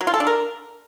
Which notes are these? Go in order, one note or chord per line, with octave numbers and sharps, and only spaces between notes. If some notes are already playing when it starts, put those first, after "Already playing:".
F#3
F4
A4
D4
A#4